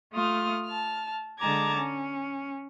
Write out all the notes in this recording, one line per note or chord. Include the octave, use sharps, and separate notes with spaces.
A3 F4 D#6 F6
A5 F6
D3 G#3 A5 A#5 D6 G#6
C#4